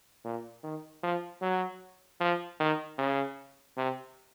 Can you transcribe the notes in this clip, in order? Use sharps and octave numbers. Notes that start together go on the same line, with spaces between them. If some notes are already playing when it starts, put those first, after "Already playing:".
A#2
D#3
F3
F#3
F3
D#3
C#3
C3